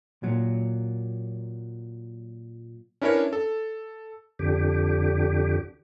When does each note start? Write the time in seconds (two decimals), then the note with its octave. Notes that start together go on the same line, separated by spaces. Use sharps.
0.23 A#2 F#3
3.02 C#4 D4 E4 A#4 B4 C#5
3.33 A4
4.39 F2 D3 G4